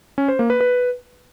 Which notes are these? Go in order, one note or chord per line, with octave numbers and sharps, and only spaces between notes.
C#4
C5
A#3
B4
B4